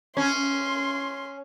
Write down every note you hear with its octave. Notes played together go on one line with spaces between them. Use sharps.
C#4 C6